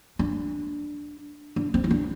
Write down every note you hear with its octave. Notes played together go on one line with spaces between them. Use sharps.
D4
D4
C4
E4
D4